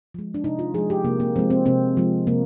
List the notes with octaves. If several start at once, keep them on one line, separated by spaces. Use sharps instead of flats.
F3 G#3
D4
C3 D#4
F4
F3 G#3 G#4
G4
C3 A#3
A#3
F3 G#3 C4
C4
C3 C4
F3 G#3
C3 A#3